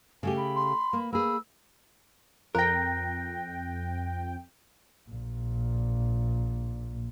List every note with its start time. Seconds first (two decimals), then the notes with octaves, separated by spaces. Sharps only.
0.23 C#3 A3 G4 G#5
0.37 B5
0.55 C6
0.93 A#3
1.13 A#3 G#4 B5 E6
2.55 F2 A#4 G5 F#6 A#6
5.10 A#1 A#2